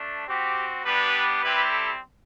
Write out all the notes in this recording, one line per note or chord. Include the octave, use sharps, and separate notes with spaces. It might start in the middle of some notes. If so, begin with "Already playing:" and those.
Already playing: A3 D4
C4 F#4 G4
G3 B3 D4 G4 B4
G3 C4 E4 G4 B4
A4